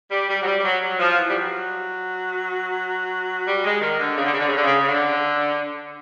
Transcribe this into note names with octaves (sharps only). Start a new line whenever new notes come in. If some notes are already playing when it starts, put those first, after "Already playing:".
G3
G3
F#3
G3
G3
F#3
F#3
F3
E3
G3
F#3
G3
G#3
D#3
D3
C#3
D3
C#3
D3
C#3
D3
C#3
C#3
D3